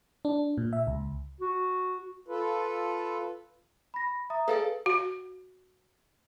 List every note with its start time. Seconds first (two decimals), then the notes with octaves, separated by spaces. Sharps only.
0.25 D4
0.58 A#2
0.73 E5
0.87 C#2
1.40 F#4
2.28 F4 A4 B4
3.94 B5 A#6
4.30 E5 A#5 D#6
4.48 G#4 A4 B4 D5 F5
4.86 F#4